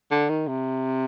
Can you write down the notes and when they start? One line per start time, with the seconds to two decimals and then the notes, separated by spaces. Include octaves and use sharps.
0.11 D3
0.29 D#3
0.47 C3